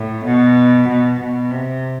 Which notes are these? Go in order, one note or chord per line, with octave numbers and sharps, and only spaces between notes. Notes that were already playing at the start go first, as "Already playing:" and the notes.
Already playing: A2
B2
B2
B2
C3